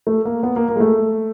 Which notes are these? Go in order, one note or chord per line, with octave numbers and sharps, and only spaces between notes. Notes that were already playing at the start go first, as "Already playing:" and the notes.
A3
A#3
B3
A#3
A#3
G#3
A3